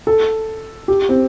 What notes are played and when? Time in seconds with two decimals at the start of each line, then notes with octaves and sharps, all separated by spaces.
0.07 A4
0.88 G4
1.09 C4